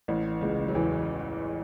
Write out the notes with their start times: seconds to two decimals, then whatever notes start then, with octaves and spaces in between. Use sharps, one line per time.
0.08 A1 A2
0.41 C#2 C#3
0.68 F#3
0.75 E2 E3